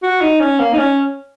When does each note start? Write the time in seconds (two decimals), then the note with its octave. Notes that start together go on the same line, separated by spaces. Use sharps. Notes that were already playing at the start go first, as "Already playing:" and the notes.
0.03 F#4
0.21 D#4
0.40 C#4
0.60 A#3
0.73 D#4
0.78 C#4